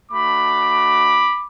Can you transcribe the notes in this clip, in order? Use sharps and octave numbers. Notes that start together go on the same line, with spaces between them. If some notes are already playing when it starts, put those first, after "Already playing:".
A3 D4 F#4 B5 D6